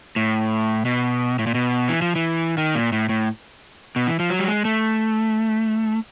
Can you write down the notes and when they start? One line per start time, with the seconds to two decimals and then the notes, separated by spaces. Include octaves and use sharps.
0.16 A2
0.85 B2
1.39 A2
1.47 A#2
1.55 B2
1.89 E3
2.02 F3
2.16 E3
2.58 D#3
2.75 A#2
2.92 A2
3.09 A2
3.96 B2
4.07 E3
4.20 F3
4.30 F#3
4.39 G3
4.48 G#3
4.65 A3